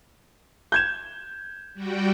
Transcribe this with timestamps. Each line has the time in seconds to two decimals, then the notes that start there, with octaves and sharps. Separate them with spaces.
0.72 G6 G#6 E7
1.74 G3 F#4 G5